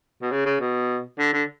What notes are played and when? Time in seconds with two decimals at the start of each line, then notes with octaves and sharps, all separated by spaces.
0.22 B2
0.32 C#3
0.46 C#3
0.60 B2
1.19 D3
1.33 D3